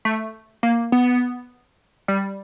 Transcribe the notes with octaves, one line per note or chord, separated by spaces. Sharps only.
A3
A#3
B3
G3